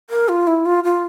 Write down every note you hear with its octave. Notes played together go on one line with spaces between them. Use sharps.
A#4
F4
E4
F4
F4